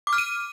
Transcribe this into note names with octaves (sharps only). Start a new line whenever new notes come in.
D6
F6
D#7